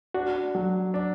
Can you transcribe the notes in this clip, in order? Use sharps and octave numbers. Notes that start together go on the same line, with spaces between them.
D4 F#4
F#3
D4